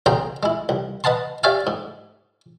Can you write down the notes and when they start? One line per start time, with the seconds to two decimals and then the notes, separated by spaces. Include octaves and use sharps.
0.06 B1 C#3 G#4 G5 A#5 C6
0.43 G#3 E4
0.69 C2
1.04 B4 D#5 F#5 A5 C6
1.43 G4 C#5 D5 E5 F5 G#5
1.67 G#2